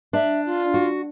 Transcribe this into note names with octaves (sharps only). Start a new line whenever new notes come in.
D4 E5
F4
F#4